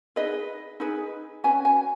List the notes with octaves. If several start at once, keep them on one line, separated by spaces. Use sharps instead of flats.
D#4 G#4 B4 D#5
D#4 G#4 B4
C#4 F#4 B4 G#5
G#5